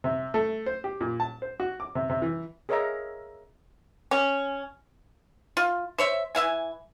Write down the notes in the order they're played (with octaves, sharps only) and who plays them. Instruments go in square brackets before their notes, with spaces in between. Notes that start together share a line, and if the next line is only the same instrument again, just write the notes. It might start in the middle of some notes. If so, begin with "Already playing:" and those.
[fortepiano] C3
A3
C5
G4
A#2
A5
C5
F#4
D6
C3
C3
E3
[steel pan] G#4 A#4 C#5 D#5 E5 A#5
[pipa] C#4
F4
C5 C#5 E5
E3 E5 F5 G#5